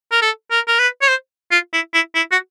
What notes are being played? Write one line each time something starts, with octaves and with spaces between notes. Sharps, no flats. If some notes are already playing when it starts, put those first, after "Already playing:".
A#4
A4
A#4
A#4
B4
C#5
C5
F4
E4
E4
E4
F#4